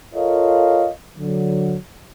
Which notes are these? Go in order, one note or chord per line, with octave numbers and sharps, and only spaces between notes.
F4 A4 A#4 C#5 D#5 F5
D3 F#3